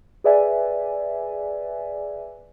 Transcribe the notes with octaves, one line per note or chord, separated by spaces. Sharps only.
G#4 B4 D5 E5 G#5